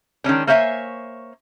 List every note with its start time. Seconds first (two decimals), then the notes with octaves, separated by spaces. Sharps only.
0.24 D#3 G#3 C#4 D4
0.47 A#3 C5 C#5 E5 F#5 G#5